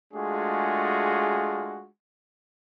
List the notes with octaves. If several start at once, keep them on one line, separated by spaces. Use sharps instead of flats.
G#3 A3 D4 F4 F#4 G#4